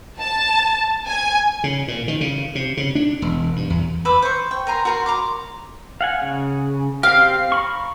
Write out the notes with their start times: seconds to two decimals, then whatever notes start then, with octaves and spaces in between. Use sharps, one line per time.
0.20 A5
1.06 G#5
1.64 C#3
1.88 A#2
2.08 D#3
2.21 C#3
2.55 C3
2.77 C#3
2.95 D4
3.22 E1
3.56 G2
3.70 E2
4.05 B4 E5 D6
4.22 C5 C#6
4.51 G5
4.67 A#4 G#5 A#5 C6
4.85 F#4 A#4 C6
5.06 A#5 C6 D6
6.01 F5 F#5 G#5
6.22 C#3
7.03 C4 G4 F5
7.52 A#5 B5 C#6